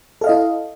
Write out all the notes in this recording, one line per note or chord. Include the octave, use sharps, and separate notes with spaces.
E4 A4 D#5 F5